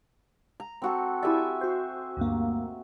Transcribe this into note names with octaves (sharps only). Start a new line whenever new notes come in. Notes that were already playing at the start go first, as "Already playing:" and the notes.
A#5
C4 F#4 A4
E4 G4 D5 E5 G#5
F#4 C5
D2 G2 A#3